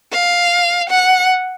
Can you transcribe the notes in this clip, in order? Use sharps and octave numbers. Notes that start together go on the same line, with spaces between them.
F5
F#5